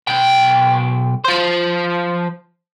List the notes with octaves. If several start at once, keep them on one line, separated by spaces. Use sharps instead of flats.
B1 G5
F3 C5